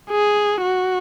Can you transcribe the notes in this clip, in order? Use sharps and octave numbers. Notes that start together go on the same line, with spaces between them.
G#4
F#4